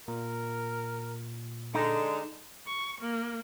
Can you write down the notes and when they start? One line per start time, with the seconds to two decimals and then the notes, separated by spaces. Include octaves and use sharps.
0.08 A#2 A#4
1.75 D3 G#3 D#4
2.67 C#6
3.01 A#3